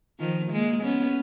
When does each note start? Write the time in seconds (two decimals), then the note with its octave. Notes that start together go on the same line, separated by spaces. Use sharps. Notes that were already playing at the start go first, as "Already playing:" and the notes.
0.19 D#3 F3
0.52 G#3 A#3
0.83 B3 C#4